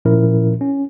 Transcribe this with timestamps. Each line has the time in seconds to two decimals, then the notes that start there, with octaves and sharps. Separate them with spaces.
0.05 A#2 F3 C#4 E4 A#4
0.61 C#4